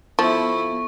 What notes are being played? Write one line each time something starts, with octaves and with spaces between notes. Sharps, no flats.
F3 B3 E4 A4 C#6